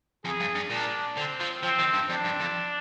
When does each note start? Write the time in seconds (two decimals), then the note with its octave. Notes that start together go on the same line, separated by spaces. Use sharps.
0.24 F2 G#4
0.40 G2
0.55 G2
0.70 A#2 D4
1.17 D3 C4
1.40 F3
1.63 F3 C4
1.79 D#3
1.94 G2
2.09 F2 D4
2.25 G2
2.41 F2